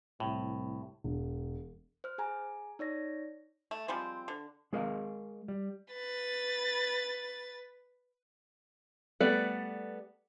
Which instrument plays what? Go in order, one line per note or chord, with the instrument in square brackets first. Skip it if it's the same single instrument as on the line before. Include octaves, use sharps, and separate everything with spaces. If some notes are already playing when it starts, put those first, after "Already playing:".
[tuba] C2 [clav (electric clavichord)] A2
[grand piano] E1
[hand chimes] C5 F6
G#4 G#5 A#5
D#4 C#5 D5 A#6
[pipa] A3
F3 G3 G#3 C4
D3
[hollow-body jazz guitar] G#3 G#4 A#4 D#5 F5
G3
[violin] B4 A6
[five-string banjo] G3 A3 B3 D5